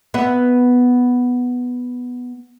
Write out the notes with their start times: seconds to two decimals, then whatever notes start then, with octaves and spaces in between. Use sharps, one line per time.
0.14 B3 E5